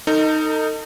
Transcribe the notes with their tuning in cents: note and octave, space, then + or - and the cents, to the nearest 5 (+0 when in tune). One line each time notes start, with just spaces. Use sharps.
D#4 +0 A4 +45